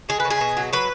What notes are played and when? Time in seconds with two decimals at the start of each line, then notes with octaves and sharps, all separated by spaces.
0.09 G#3 G#4
0.20 B4
0.25 C#3
0.30 G#4
0.41 B2
0.57 F#3
0.73 F#3 B4